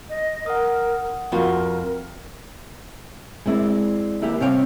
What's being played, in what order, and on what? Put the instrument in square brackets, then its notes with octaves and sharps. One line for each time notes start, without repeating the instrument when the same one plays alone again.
[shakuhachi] D#5
[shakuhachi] A#4 [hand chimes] F#5 D#6
[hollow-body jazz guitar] F2 F4 F#4 [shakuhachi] A#4
[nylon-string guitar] G#3 C4 E4 D5
D#2 E4 G4 B4
C3 G3 C4 C#5 F5 G5